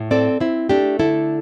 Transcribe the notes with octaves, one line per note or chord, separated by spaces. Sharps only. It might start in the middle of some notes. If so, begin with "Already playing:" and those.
Already playing: A2
C4 A4 D5
C4 E4
A3 D4 G4
D3 E4 A4